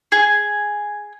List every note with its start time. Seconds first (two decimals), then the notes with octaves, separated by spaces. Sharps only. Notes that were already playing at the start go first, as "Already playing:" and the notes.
0.12 G#4